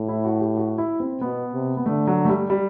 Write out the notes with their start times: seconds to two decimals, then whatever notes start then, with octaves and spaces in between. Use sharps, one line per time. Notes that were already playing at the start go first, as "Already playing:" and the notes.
Already playing: A2
0.09 E4
0.25 F#4
0.41 G4
0.57 F#4
0.78 E4
1.00 C4
1.21 B2 B3
1.53 C3
1.77 B3
1.86 D3 A3
2.07 F#3
2.25 A3
2.29 G3
2.50 G3